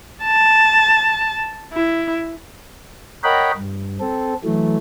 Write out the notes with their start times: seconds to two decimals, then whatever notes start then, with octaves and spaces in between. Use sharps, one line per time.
0.24 A5
1.73 E4
3.24 A#4 C#5 D#5 F#5 G5 B5
3.57 G2
4.00 C4 A4
4.44 E3 F#3 A3